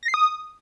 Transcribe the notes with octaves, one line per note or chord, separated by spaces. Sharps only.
A#6
C7
D#6